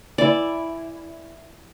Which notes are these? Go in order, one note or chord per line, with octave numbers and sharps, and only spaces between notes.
E3 E4 D5